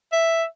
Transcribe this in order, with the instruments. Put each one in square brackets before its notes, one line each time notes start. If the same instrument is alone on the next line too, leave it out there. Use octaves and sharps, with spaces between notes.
[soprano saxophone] E5